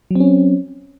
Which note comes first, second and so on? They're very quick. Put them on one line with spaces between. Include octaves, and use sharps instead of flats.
F#3 C4 C#4